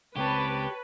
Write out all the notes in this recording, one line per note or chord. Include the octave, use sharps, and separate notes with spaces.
C#2 C4 G4 B4 C#5 A5